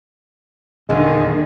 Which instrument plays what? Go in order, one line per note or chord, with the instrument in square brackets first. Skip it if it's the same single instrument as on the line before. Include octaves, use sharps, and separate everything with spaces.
[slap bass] D#1 E2 [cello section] D3 D#3 G#4 [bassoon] G#3